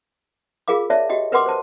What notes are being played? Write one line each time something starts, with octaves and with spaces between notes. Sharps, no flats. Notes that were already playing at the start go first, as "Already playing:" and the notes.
F4 G#4 A#4 F5 D6
C#5 D5 E5 A5
F#4 G4 D#5 G5
A#4 B4 F#5 C6 D6
C5 A5